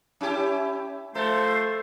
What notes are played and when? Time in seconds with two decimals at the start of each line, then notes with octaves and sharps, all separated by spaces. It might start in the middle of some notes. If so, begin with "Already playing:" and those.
0.21 C#4 E4 G4
1.15 F3 A3 A4 C5